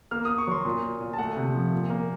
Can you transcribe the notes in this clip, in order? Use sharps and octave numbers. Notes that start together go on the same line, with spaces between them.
A#3 F6
A#3 D#6
C#6
F#3 C6
A#2
A#2
A#2
A5
A3 F#5
C3
F3
A#2
A#3